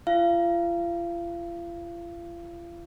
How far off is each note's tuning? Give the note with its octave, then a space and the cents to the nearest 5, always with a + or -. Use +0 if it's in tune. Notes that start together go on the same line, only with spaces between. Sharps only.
F4 -40 F5 -30